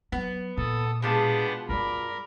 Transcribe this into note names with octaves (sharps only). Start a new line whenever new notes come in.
F#3 B3
A#2 A4 D#6
B2 G#3 B3 D4 F4 G4 A5
F#2 G3 A#4 D5 B5